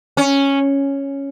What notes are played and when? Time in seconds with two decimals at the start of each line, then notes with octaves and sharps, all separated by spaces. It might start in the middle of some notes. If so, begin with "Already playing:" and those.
0.17 C#4